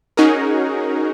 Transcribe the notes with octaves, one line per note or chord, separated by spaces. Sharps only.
C#4 D#4 F#4 G#4 A#4